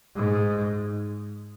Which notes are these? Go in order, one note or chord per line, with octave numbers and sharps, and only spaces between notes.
G#2